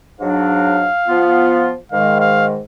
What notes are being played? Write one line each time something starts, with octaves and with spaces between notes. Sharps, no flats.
G#2 F#3 D4 F5
F3 B3 F4
G#2 D#3 G#3 F5
F5